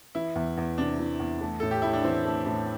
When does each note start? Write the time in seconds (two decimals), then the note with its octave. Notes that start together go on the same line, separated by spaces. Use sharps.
0.15 E3 E4
0.35 E2
0.57 E2
0.78 C3 D4
0.99 E3
1.19 E2
1.41 A3
1.60 A2 A4
1.71 G4
1.82 A2 E4
1.93 D4
2.04 E3 C4
2.25 A3
2.46 A2